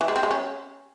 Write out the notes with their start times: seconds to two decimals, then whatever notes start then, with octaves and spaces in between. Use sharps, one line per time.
0.01 E3
0.08 G#3
0.16 C4
0.23 G#3
0.31 C#4